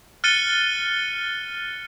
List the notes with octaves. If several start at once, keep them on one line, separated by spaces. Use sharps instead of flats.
F6 F#6 A6 C#7 D#7 G7